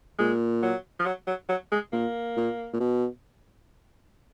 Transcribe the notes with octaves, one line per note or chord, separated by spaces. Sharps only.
A#2 G#3
F#3
F3
F#3
F#3
F#3
G#3
A#2 A#3
A#2
A#2
B2